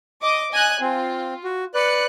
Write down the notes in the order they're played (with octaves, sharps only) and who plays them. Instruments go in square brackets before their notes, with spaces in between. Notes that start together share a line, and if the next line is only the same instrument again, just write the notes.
[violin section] D#5 D6
D#5 G#5 F#6
[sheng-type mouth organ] C4 [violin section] F4
[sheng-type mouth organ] F#4
[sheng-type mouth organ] B4 D5 [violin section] F#6 C#7